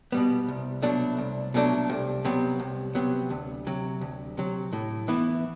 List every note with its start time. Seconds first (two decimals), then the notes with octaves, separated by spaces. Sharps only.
0.12 B2 G3 B3
0.48 C2
0.82 B2 F#3 A3 D4
1.18 C2
1.54 B2 F#3 A3 D4
1.90 C2
2.25 C3 F#3 B3
2.59 C2
2.95 C3 F#3 B3
3.30 D2
3.67 C3 F#3
4.01 D2
4.37 C3 F#3
4.73 A2
5.08 E3 B3 E4